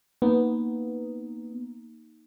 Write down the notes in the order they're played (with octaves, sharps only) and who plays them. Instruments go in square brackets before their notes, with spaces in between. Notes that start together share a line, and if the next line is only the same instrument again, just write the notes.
[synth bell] A#3 D#4 [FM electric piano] B3